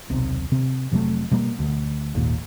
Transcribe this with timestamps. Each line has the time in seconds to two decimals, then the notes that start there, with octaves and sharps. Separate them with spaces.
0.10 D#1 B1 C3
0.52 C3 C4
0.91 F1 C3 F#3 A3
1.31 B2 G3 A#3
1.59 D2
2.15 G#1 D#2 A#2